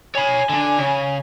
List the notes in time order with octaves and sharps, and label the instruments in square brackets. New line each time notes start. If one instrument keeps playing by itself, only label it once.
[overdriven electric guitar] C#5 B5 [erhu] G#5
[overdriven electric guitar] D3 D4
C#3